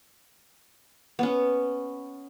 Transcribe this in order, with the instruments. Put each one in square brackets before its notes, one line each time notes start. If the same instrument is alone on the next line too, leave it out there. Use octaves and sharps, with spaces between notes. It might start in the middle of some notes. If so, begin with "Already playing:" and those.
[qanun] B3 C#4